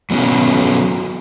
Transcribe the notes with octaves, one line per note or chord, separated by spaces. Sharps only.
F#3 B3 C#4 E4 F#4